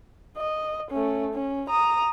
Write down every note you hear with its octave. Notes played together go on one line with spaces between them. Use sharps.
D#5
A3 C#4
C#4
A#5 D#6